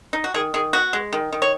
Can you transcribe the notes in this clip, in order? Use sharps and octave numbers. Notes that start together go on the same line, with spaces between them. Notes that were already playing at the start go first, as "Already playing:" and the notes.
D#4
F#4
D#3 G#4
D#3 G#4
B3 F#4
G#3
D#3
D#3
C#5